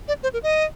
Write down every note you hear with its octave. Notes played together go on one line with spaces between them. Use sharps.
D5
C5
A#4
D#5